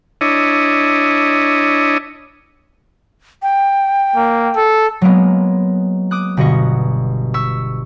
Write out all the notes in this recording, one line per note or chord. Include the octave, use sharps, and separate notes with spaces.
D4 E4 C#5 D#5
G5
A#3
A4
F#3 G#3 A#3 B3
D6 D#6 F#6
G1 B2 F#4 D#5 C#6
C#6 E6 B6